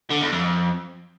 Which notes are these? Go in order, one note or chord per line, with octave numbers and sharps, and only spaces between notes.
D3
E2
F2